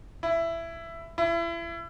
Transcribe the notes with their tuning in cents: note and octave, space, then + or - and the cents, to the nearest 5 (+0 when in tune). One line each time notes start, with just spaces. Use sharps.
E4 +15
E4 +35